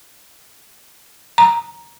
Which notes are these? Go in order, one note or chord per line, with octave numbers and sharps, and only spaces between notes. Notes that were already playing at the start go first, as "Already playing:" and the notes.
A#5